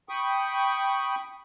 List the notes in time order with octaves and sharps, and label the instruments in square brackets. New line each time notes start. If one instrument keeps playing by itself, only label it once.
[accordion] G5 B5 C#6 D#6